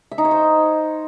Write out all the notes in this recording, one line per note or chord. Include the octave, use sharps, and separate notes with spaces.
E5
D#4
C#5
C5